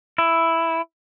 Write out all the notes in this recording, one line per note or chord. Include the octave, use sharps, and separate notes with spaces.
E4